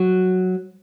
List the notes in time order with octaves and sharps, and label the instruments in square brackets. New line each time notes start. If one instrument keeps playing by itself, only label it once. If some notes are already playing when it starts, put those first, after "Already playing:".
Already playing: [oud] F#3